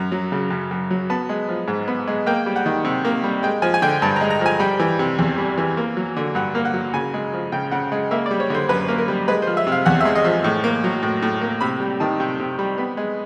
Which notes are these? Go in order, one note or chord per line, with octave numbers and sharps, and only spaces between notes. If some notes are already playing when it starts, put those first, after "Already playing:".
Already playing: F#2 A#5
F#3
C#3
F#2
F#2
F#3
B3 A5
G#3
F3
G#2
B3
G#3
A#3 G5
G3
F#5
D#3
C3
A#3
G3
G#3 G5
F3 G#5
G#5
D3 G5
G2 A5
A#5
G#3
A#5
F3 G#5
G3 G5
E3
C3
E2
G3
E3
A#3
F#3
D3
G2 F#5
A#3
F#5
F#3
C#3 G#5
G#3
F3
C#3 G5
C#3 F#5
G#3
A#3 E5
D5
G3
C#5
D3 C5
F#2 B4
A#3
A#4
G3
G#3 B4
C5
F3
E5
C3
F5
E2 F#5
E5
G#3
D#5
F3
A2
A#3
F#3
A2
A2
A#3
C3 B5
G3
D#3 A5
C3 G5
C3
G3
B3
G#3